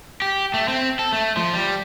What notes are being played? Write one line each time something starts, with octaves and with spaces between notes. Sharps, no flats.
G4
A3
C4
A4
A3
F3
G3